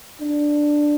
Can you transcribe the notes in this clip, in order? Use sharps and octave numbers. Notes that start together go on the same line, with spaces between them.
D4